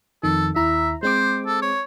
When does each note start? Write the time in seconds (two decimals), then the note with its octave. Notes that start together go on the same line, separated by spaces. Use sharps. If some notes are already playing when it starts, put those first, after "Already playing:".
0.23 F2 D#3 A4
0.56 D#2 E4 E5 A#5
1.03 G#3 C4 C5 D6
1.47 A4
1.62 C#5